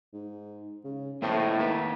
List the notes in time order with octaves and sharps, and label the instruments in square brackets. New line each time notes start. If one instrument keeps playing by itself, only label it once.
[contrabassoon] G#2
C#3
[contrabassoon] F2 [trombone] A2 [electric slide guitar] A#3 E4 C5
[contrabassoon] D#3 [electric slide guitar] A#3 B4